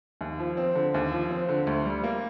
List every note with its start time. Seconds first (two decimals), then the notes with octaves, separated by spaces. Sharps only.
0.21 D#2
0.39 F3
0.57 C4
0.75 D3
0.94 D#2
1.12 F3
1.31 C4
1.49 D3
1.67 D2
1.85 G3
2.04 A#3